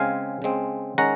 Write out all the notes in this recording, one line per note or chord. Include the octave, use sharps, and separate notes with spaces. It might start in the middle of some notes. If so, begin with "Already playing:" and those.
Already playing: C#3 G#3 C4 F5 G#5
C#3 G#3 C4
D#3 G#3 C#4 F#5 A#5